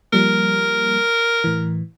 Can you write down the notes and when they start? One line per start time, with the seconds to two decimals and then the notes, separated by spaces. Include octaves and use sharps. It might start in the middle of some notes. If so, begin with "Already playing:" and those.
0.13 F3 G3 A#3 A#4
1.44 A2 E3